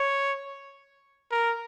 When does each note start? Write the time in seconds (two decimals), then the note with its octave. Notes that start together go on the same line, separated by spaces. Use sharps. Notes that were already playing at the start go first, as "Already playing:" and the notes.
Already playing: C#5
1.31 A#4